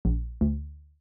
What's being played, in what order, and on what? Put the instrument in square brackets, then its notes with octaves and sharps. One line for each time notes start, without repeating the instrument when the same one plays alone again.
[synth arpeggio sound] A#1
D2